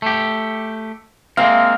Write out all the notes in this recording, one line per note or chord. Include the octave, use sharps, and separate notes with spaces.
A3 G4
G#3 A#3 C4 F5